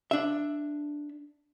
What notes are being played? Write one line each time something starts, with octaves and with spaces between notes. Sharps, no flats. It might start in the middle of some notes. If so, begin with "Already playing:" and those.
D4 E5